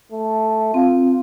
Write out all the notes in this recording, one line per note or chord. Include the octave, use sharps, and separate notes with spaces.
A3
C4 F4